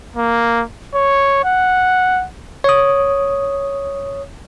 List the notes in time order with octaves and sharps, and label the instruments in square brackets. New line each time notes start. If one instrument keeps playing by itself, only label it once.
[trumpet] A#3
C#5
F#5
[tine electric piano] C#5 D#6